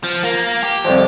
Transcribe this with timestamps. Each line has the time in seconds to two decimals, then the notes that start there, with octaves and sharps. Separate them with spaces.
0.04 F3
0.23 A#3
0.63 G4
0.85 C2 F2 F3